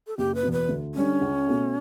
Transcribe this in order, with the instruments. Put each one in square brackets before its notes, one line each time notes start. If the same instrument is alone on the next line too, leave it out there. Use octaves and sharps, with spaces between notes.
[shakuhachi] A4
[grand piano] F#1 [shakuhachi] G4
[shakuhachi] B4
[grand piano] E2 B2
[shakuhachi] B4
[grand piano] D2
[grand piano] D3 G3 D4 [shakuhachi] C#4
[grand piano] C#2
B2 A3